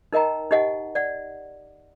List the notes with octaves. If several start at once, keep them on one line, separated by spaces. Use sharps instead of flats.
D#4 A#4 D#5 G5 A#5
D#4 G4 D#5 F#5 G#5
D5 F#5